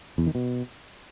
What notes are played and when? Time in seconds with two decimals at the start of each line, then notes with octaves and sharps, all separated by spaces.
0.18 E2
0.26 D#3
0.35 B2